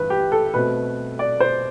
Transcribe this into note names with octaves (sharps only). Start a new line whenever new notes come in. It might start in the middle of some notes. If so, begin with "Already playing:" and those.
Already playing: G2 E3 B4
G4
A4
B2 A3 C4 B4
D5
C5